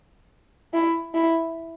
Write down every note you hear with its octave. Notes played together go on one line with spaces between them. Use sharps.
E4
E4